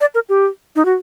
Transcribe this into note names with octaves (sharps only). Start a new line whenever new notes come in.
D5
A#4
G4
D#4
F#4